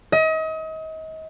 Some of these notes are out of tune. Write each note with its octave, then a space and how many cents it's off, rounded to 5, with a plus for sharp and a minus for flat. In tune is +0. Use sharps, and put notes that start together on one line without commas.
D#5 +35